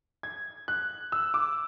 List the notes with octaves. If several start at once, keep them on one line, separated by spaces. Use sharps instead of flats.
G#6
F#6
E6
D6